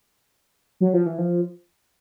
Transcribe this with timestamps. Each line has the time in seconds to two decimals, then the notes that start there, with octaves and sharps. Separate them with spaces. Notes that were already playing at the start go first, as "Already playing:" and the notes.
0.81 F#3
0.94 F3
1.06 E3
1.18 F3